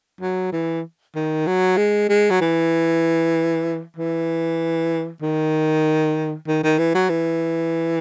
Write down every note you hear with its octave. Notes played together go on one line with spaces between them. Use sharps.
F#3
E3
D#3
F#3
G#3
G#3
F#3
E3
E3
D#3
D#3
D#3
E3
F#3
E3